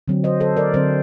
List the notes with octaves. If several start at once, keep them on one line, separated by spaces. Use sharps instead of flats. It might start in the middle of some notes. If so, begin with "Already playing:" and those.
D3 F#3 C4
C5 D#5
A4 C5
A#4 D5
D3 F#3 C4 A4 C5